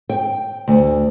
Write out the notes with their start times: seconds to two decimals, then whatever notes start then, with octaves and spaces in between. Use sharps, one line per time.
0.10 G5
0.68 D2